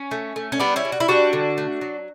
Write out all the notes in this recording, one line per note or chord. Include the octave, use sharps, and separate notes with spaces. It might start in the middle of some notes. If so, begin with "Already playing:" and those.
Already playing: C#4
A3
A3
C#4
G3 B3 D4
C#4 E4
G3
F#4
E4
G3 D4 F#4
D3
A3
F#3